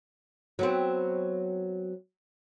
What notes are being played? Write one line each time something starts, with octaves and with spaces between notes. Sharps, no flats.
F#3 B3 C4